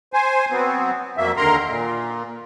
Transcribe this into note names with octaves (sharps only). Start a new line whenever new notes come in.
C5 G#5
F#3 B3 C4
F2 F#3 A#3 E5
D#2 D3 A#4 A#5 C6
A#2